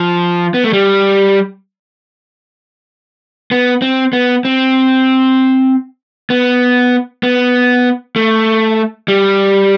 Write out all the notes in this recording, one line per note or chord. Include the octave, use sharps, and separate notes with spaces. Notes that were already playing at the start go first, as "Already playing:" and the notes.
Already playing: F3
B3
A3
G3
B3
C4
B3
C4
B3
B3
A3
G3